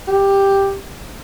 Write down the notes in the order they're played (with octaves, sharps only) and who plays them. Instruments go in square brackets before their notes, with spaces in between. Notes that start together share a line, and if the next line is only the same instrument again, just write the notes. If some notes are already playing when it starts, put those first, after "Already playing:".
[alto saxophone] G4